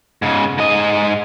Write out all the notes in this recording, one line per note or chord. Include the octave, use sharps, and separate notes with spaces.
G#2 C#3
G#2 D#5